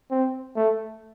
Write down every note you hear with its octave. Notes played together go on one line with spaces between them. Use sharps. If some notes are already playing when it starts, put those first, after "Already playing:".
C4
A3